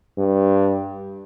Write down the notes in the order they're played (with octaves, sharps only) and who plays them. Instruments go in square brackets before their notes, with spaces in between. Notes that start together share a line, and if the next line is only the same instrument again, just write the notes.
[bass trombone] G2